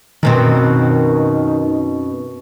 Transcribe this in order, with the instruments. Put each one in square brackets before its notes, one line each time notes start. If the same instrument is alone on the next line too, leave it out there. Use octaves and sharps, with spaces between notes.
[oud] F#2 B2 C4 [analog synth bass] D#3